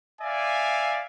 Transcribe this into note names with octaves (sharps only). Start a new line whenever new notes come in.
D5 E5 F5 G#5